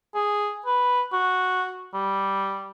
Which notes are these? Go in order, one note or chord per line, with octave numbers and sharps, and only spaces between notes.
G#4
B4
F#4
G3